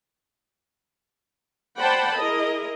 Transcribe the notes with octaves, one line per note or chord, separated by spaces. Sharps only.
C5 D5 F#5 G5 A5 B5
E4 G#4 A#4 D#5